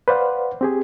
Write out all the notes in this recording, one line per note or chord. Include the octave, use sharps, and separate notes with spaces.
B4 C5 D5 F5 F#5
C4 G4 G#4